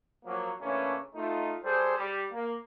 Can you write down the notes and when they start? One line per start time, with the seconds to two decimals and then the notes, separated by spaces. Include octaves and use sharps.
0.25 F3 F#3 A#3
0.61 C#3 E3 A3 A#3 C#4 D4
1.15 A3 D#4 F4
1.64 G3 G#4 A4 C5
1.96 G3 G4
2.32 A#3